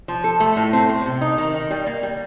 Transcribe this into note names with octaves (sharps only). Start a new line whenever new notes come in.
F3
A4
A3
A2
C4
C4
C3
D#4
D#3
D#3
G3
A#3
G3